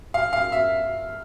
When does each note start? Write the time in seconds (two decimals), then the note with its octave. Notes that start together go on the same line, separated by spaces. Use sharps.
0.14 F5
0.33 F5
0.52 E5